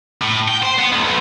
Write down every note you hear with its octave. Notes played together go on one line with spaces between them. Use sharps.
A2
G5
C5
B3
D2
B1